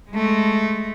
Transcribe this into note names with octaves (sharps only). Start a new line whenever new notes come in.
G#3 A3